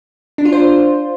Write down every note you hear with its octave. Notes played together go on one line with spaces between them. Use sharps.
D4
F4
C5